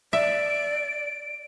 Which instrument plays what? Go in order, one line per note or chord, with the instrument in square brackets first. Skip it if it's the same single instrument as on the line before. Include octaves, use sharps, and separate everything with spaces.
[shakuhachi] D5 [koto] E5 [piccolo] D7